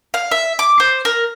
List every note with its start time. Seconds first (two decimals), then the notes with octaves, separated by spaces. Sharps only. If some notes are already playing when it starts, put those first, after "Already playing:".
0.14 F5
0.31 E5
0.59 D6
0.80 C5
1.05 A#4